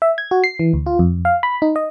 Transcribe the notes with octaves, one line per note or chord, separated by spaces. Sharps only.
E5
G#6
F#4
C7
E3
D2
F4
F2
F5
B5
D#4
D#5